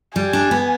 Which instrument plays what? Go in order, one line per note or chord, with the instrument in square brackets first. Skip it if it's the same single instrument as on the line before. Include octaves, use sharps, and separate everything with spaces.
[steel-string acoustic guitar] G3 [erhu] G#5
[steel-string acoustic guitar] D4
B3